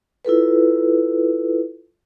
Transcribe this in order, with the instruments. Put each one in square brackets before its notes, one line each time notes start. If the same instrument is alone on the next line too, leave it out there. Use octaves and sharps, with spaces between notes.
[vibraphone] E4 F4 A4 B4